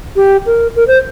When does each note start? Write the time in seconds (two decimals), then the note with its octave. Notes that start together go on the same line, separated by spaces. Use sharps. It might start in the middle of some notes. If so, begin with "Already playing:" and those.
0.16 G4
0.46 A#4
0.76 A#4
0.87 C5